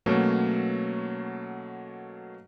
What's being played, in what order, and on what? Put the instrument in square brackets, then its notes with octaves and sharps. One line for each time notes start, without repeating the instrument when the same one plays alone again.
[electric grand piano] B2 F#3 A3 A#3 C#4 F#4